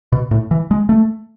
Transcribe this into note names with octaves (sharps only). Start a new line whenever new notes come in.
B2
A2
E3
G#3
A3